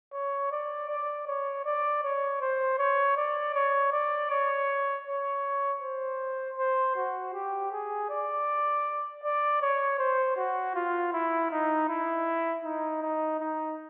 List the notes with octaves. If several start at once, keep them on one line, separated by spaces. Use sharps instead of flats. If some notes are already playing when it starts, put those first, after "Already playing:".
C#5
D5
D5
C#5
D5
C#5
C5
C#5
D5
C#5
D5
C#5
C#5
C5
C5
F#4
G4
G#4
D5
D5
C#5
C5
F#4
F4
E4
D#4
E4
D#4
D#4
D#4